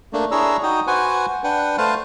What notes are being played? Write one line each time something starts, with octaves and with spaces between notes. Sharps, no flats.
A3 A#3 D4
D4 E4 G#4 C#5 A#5 E6
D#4 F#4 G5 D#6
F#4 B4 C5 F#5 G#5
D4 B4 F#5 G5
A3 B4 C5 F5 A5